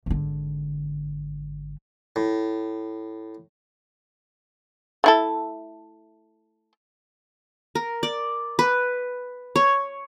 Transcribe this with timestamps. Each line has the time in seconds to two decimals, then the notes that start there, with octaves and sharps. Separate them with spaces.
0.06 G#1 D3
2.16 A2
5.04 A3 E4 A4
7.75 A#4
8.03 D5
8.59 B4
9.56 C#5